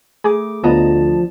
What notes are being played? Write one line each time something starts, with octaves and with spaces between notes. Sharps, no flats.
A3 G#4 D6
D2 F3 B3 D5 D#5 A5 A#5